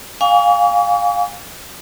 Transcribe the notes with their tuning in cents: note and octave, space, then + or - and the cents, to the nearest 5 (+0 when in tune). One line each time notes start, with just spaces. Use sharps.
F5 +20 G#5 -35 C#6 +45